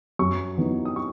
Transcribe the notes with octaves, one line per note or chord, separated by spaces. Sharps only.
F#2 C#6
E3 B3 D#4
D#6
C#6